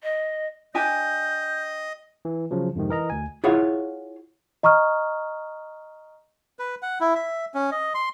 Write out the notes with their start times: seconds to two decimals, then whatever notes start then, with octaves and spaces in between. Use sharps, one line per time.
0.03 D#5
0.75 D4 G4 D#5 G#5 G6
2.25 E3
2.51 C#3 F3 F#3
2.76 F2 G#2 C3 D#3
2.89 E3 A#4 D#5 A#5
3.10 D2 G#5
3.44 E4 F4 G#4 C#5 F5 F#5
4.63 D#5 A#5 C#6 D#6 F6
6.59 B4
6.83 F#5
7.01 E4
7.15 E5
7.54 C#4
7.72 D#5
7.95 C6